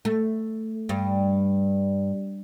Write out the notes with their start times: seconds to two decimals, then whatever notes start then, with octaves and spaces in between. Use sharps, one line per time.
0.05 A3
0.89 G2